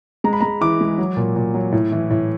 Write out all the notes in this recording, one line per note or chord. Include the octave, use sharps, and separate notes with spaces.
G#3 A#5
B5
G#3 A#5
E3 D6
G#3
F#3
A#2
A#2
F#3
A2
E3
A2